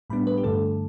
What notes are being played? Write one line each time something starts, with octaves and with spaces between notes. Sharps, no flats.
A2 G3 B3 D4 B5
B4
G4
G2 D3 A3 A4